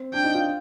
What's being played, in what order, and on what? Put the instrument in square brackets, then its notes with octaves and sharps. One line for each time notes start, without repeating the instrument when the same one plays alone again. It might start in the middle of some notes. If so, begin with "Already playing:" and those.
Already playing: [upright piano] C4
[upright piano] D4 [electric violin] G5
[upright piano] D#4
F4